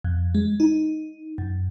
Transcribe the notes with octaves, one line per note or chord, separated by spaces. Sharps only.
F2
G#3
D#4
F#2